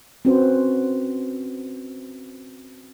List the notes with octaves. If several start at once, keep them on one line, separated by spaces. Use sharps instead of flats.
C4 C#4 F#4 B4 C5